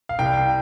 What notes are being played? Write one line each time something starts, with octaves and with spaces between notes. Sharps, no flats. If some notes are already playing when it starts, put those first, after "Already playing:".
F5
C2 G5